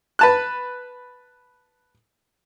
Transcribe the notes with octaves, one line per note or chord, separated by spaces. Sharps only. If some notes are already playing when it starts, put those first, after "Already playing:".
B4 A5 F#6